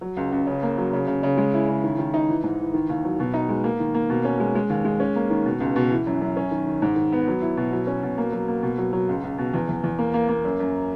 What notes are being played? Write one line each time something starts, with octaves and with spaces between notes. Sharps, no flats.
F#3
C#2
C#2
C#3
A#3
F#3
C#3
C#3
C#3
G#3
E4
C#3
D#3
D#3
D#4
E3
G#2
E3
D#3
D#2
F#3
B2
D#4
G#3
A#3
D#3
A#3
B2
C#4
G#3
G#3
D#2
G#3
C#4
A#3
D#3
B2
C#2
B2
E3
F#2
F#2
C#4
D#3
D#3
G#2
D#3
B3
F#3
E4
B2
F#3
C#4
B2
A#3
F#3
A#3
B2
F#3
F#3
C#2
C#2
B2
E2
E2
E2
A#3
A#3
A#3
F#2
F#2